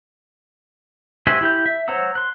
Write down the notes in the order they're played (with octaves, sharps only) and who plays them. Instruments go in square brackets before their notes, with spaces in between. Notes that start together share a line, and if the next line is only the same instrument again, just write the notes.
[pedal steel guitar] F#4 G4 C5 E5 G#5
E4 G4 G6
E5
C5 C#5 F#5 A#5 E6
C6 F#6